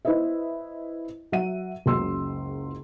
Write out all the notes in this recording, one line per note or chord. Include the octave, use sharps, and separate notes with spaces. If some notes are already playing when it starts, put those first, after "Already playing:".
E4 B4 C5 D#5 E5
F#3 E5 F#5 D#7
F#1 C#2 F#3 C6 E6